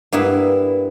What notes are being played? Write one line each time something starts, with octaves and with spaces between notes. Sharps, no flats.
G2 A#3 B3 E4